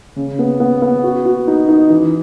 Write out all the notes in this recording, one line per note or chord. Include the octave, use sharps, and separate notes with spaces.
C#3
B3
B3
B3
F#4
F#4
D#4
D#4
E3